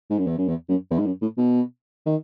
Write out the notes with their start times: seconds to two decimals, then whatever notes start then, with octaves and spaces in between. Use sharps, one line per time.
0.10 G#2
0.18 F#2
0.27 E2
0.38 F#2
0.48 E2
0.69 F#2
0.91 E2
0.99 G#2
1.06 F#2
1.22 A2
1.37 B2
2.06 D#3